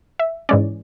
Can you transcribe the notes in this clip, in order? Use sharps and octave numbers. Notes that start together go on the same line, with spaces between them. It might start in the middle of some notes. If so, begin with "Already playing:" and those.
E5
G#2 E3 G#3 C#4 D5